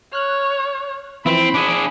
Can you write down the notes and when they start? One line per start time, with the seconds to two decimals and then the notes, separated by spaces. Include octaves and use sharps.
0.13 C#5 F6 F#6
1.26 E3 F3 C4 E4 B5
1.54 D4 G#4